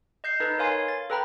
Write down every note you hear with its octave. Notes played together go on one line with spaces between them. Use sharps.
D#5 G6 C7
D#4 A4 B4 D#5
A#4 C#5 F5 G#5 C6
A6
A4 B4 G5 A#5 B5